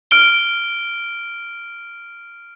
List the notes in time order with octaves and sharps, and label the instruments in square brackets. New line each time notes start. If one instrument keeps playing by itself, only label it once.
[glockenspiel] F6 D7 G7